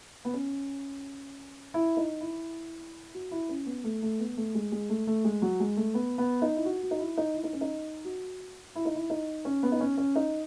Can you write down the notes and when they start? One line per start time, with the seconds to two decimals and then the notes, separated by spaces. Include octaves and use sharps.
0.25 B3
0.34 C#4
1.74 E4
1.97 D#4
2.21 E4
3.14 F#4
3.31 E4
3.49 C#4
3.66 B3
3.84 A3
4.02 A3
4.19 B3
4.37 A3
4.55 G#3
4.72 G#3
4.89 A3
5.07 A3
5.24 G#3
5.42 F#3
5.60 G#3
5.77 A3
5.94 B3
6.18 B3
6.42 D#4
6.56 E4
6.65 F#4
6.83 F#4
6.91 D#4
7.00 E4
7.18 D#4
7.35 E4
7.44 D#4
7.53 C#4
7.61 D#4
8.05 F#4
8.75 E4
8.85 D#4
8.95 E4
9.10 D#4
9.45 C#4
9.63 B3
9.72 D#4
9.80 C#4
9.98 C#4
10.16 D#4